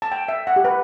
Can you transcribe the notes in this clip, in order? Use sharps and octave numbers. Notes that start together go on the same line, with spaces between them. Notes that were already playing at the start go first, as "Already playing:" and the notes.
A5
G5
E5
F#5
G4
B4